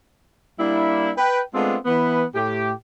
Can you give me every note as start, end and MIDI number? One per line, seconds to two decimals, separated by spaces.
0.59 1.10 55
0.59 1.10 58
0.59 1.10 62
0.59 1.10 64
1.17 1.41 71
1.17 1.41 79
1.54 1.76 56
1.54 1.76 57
1.54 1.76 59
1.54 1.76 60
1.54 1.76 62
1.54 1.76 65
1.85 2.24 52
1.85 2.24 59
1.85 2.24 71
2.35 2.72 45
2.35 2.72 67